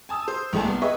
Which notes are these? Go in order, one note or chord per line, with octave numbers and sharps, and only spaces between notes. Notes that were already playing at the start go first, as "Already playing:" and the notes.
G#5 A5 D#6 E6
C5
A#1 G#2 D#3 A3 G#5 A5
C2 B3
G#4 B4 D#5 E5 C#6